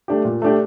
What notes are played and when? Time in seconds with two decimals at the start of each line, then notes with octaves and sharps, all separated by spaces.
0.08 A3 D4 G4
0.25 A#2
0.42 A3 D4 G4